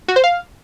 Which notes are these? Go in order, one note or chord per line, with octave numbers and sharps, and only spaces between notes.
F#4
C5
F5